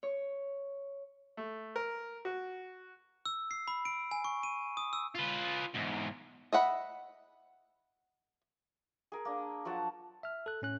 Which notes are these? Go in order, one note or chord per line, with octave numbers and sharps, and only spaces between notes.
C#5
A3
A#4
F#4
E6
C7
B5
D7
G#5
C#6
D#7
D#6
E6
F4 B4
E2 G#2
D#5 E5 F#5 B5
G#4 A#4
A#3 D4
F3 F#3 F#5 A5
E5 F6
A4 F#6
A2 C#4 F#6